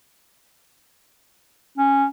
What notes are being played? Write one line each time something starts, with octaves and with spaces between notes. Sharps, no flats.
C#4